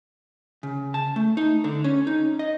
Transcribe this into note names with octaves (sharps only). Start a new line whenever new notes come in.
C#3
A5
A3
D#4
D3
C#4
D#4
D#5